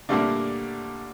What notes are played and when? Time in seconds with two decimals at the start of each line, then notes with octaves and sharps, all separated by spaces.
0.09 A#2 D3 G3 A3 A#3 D4